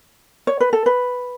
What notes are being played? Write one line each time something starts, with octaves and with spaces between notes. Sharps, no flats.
C#5
B4
A4
B4